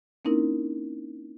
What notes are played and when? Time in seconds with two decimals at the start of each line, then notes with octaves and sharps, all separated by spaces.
0.25 A#3 C4 C#4 D#4 E4 A#4